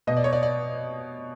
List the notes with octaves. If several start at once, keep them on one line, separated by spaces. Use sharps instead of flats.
B2 D#5
D5
C#5
D5
D5